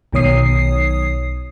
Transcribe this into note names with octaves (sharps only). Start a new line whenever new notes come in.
B1 B2 D#3 C#5 D#6 C7